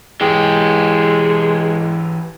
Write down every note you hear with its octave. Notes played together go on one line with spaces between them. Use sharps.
E3 G#3 G4